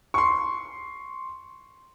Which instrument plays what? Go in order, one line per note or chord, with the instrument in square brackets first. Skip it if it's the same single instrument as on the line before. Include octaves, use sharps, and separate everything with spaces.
[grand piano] C6 C#6